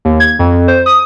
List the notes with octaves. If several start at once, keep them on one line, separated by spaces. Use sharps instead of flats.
D#2
G#6
F2
C5
D#6